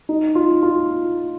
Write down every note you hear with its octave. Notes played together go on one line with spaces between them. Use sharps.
D#4
F4
F4